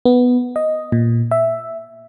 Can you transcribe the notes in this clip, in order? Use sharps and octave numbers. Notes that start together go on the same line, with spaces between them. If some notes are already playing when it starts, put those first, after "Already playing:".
B3
D#5
A#2
E5